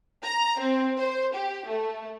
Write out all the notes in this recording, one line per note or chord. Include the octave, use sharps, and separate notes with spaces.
A#5
C4
C5
G4
A3